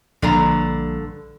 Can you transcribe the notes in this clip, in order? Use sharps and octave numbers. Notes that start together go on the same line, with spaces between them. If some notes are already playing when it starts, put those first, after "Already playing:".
A#1 G2 D3 A#5